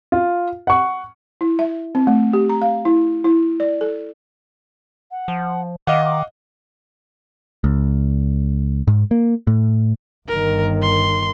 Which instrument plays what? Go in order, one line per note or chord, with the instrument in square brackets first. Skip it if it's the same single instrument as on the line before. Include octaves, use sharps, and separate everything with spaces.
[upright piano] F4
F#5 C#6
[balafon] E4
E5
C4
A3
G4
A#5
F5
E4
E4
D5
A4
[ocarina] F#5
[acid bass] F3
[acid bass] D#3 [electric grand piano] D#5 F5 F#5 [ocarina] D6
[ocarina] D6
[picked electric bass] C#2
G#2
A#3
A2
[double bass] G1 D#3 [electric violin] A#4
[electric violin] C6